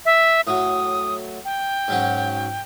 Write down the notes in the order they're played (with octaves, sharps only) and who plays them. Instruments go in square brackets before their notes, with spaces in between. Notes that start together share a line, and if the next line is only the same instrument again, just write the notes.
[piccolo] E5
[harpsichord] A2 F#3 [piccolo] D#6
[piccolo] G5
[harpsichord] G#2 F#3 C#4